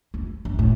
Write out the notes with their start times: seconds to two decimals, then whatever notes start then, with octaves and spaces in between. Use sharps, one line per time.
0.14 F2
0.45 G2
0.59 A2